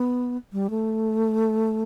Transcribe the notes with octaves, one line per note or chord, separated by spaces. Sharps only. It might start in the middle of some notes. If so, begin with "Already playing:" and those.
Already playing: B3
G3
A3